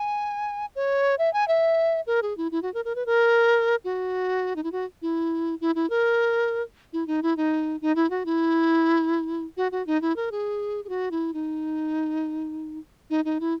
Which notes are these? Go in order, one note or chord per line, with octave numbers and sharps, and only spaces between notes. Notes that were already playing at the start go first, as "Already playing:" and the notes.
Already playing: G#5
C#5
E5
G#5
E5
A#4
G#4
E4
E4
F#4
A#4
A#4
B4
A#4
F#4
D#4
E4
F#4
E4
E4
E4
A#4
E4
D#4
E4
D#4
D#4
E4
F#4
E4
F#4
F#4
D#4
E4
A#4
G#4
G#4
F#4
E4
D#4
D#4
D#4
E4